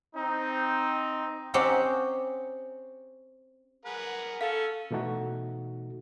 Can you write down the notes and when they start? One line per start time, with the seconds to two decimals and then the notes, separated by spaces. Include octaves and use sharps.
0.16 C4 D#4
1.54 C4 C#4 G4 D#5 F#5 A#5
3.85 G#4 A#4 B4 F#5
4.41 C#4 A4 F5
4.91 B2 E3 A3 D#4 F#4